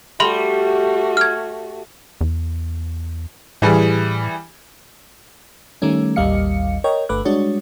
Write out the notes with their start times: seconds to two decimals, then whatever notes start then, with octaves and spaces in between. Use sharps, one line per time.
0.20 G3 A3 F#4 E5 B5 C6
1.17 F6 G#6
2.21 E2
3.62 A2 E3 G3 G#4
5.82 D#3 G3 A3 C#4
6.16 A1 D#2 G3 D#5 F5 C#7
6.84 A#4 C#5 D#5 G5
7.09 G1 A3 B4 D6 F#6
7.25 G3 G#3 D4 F#4 C#5